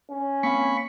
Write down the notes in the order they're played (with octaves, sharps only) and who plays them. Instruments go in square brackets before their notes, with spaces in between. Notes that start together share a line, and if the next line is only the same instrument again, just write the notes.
[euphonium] C#4
[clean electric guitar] A#3 C4 F5 [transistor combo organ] B5 C#6